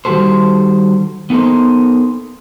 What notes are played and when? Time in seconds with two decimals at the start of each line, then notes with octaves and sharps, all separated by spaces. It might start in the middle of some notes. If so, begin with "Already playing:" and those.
0.05 D#3 G3 G#3 F#4 A4 C5
1.30 B3 D#4 A4 A#4 C5